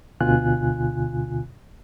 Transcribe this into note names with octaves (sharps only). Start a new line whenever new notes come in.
D2 B2 D3 F4 G#5 F#6